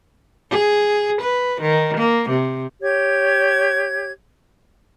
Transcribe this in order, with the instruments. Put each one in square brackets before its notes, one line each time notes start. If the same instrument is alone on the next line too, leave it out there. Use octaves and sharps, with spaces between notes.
[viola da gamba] G#4
B4
D#3
A#3
C3
[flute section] G4 C#5 G#6